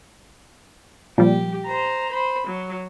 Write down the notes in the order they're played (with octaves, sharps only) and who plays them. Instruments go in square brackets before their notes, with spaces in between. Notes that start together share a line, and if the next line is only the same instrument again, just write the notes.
[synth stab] A#2 F3 G3 [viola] G4
[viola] C5 A#5
C5 B5
F#3